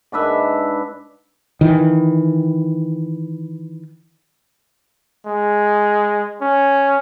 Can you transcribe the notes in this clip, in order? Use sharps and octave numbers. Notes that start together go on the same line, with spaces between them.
G#2 D4 B4 E5
D#3 E3
G#3
C#4